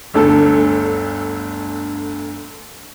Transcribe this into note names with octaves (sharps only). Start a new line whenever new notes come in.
G1 D2 D3 A4